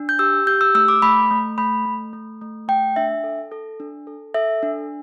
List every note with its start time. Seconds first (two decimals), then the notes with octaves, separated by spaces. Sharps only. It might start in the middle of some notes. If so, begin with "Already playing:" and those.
Already playing: D4
0.09 G6
0.19 G4 E6
0.47 G4 G6
0.61 E6
0.75 A3 E6
0.88 D6
1.02 A3 B5
1.31 A3
1.58 A3 B5
1.85 A3
2.13 A3
2.41 A3
2.68 A3 G5
2.96 D4 E5
3.24 A4
3.51 A4
3.80 D4
4.07 A4
4.34 A4 E5
4.63 D4